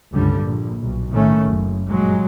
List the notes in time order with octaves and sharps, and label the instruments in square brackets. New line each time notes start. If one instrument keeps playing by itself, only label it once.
[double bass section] C#2 G2 D3 G3
A#1
B1
A2 D#3 A3 C#4
F#1
G2 A#2 F#3 G#3